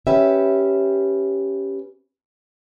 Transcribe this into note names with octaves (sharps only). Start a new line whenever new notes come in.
C#4 G4 B4 E5